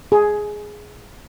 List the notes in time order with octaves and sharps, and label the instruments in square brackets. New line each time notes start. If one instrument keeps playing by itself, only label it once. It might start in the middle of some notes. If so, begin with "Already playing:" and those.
[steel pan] G#4